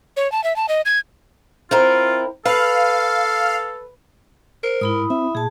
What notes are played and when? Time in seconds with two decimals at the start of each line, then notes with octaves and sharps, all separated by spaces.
0.17 C#5
0.32 A5
0.44 E5
0.56 A5
0.69 D#5
0.85 G#6
1.71 C4 E4 F4 A#4
2.45 A4 B4 F5
4.63 A#4 C5
4.81 G#2 E4 B5 D#6
5.10 C4 E5
5.35 A#2 G#4 A5